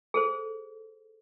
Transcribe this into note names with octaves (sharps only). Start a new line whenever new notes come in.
G#4 A4 C5